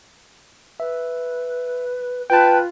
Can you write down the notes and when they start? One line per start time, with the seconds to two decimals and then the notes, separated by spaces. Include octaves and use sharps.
0.80 B4 E5
2.30 F4 B4 G5 A5